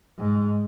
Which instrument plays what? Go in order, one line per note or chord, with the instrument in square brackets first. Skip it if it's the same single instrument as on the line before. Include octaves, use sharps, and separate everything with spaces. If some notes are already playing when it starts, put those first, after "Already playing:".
[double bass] G#2